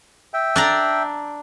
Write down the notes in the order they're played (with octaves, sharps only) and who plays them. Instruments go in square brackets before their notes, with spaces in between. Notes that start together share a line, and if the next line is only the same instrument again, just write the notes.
[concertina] E5 G5
[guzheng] D4 D5 A#5